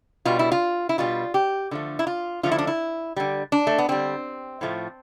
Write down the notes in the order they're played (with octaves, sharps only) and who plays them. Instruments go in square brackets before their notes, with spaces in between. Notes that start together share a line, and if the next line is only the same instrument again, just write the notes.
[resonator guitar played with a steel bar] B2 G3 F4
E4
F4
E4
B2 G3 F4
G4
D3 F3 A3
E4
F4
D3 F3 A3 F4
E4
D4
E4
D3 G3
D4
A3
B3
D3 G3 C4
A2 F3 A3